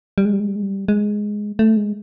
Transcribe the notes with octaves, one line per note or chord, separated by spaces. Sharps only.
G3
G#3
G3
G#3
G3
G#3
G3
G#3
A3
G#3